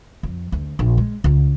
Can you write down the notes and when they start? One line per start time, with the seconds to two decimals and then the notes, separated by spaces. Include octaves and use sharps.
0.23 F2
0.52 D2
0.79 A#1
0.98 G#3
1.24 C#2